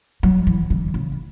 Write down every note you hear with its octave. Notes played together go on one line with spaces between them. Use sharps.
F#3
E3
D3
C#3